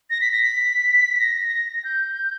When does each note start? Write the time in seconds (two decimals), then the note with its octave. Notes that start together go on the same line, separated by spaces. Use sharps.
0.10 A#6
0.21 B6
0.32 A#6
0.43 B6
1.20 A#6
1.77 A#6
1.84 G6